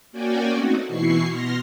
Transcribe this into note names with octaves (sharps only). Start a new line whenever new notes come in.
A#3 C#4 F#4 D5 G5 G#5
A3 C4 D#4 F#4
B2 E3 E4 C#6 C7
B2 C6 F6 A#6